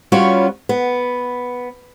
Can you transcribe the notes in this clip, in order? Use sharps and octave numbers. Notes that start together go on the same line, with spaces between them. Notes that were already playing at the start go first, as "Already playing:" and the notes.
G3 B3 C#4 F4 F#4 C#5
B3